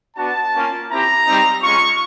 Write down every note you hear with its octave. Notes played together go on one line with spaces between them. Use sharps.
B3 D4 F#4 A5
A#3 C#4 F4
C4 E4 G4 A#5
G3 C4 D#4 G4
G#3 C#4 F4 C#6